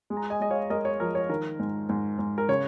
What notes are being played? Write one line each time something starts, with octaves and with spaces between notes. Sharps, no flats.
G#3
A#5
D#5 G#5
G#3 D#5
C#5 F5
G#3 A#4 D#5
C#5
F3 A#4
C#5
D#3 A#4
G#2
G#2
G#2
A#4
C#3 C#5